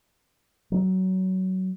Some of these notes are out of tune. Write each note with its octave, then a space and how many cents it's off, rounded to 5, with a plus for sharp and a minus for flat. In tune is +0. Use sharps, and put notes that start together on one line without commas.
F#3 +20